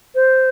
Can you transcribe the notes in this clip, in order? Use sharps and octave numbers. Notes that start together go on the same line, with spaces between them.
C5